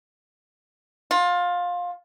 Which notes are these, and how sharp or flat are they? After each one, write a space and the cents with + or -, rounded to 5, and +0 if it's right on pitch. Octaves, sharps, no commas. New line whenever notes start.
F4 +20